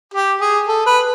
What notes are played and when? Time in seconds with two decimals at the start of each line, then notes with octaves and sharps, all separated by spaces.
0.14 G4
0.41 G#4
0.68 A4
0.86 B4